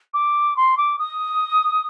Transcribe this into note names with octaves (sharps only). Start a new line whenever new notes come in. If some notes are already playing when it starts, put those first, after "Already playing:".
D6
C6
D6
D#6